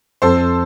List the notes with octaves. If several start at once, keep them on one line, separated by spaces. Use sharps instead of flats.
F2 A4 C5